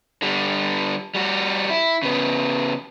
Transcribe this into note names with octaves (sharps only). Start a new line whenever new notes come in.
D3 G3
G3 F#4
E4
C#3 B3